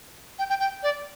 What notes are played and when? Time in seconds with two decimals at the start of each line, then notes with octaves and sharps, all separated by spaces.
0.39 G5
0.49 G5
0.60 G5
0.83 D5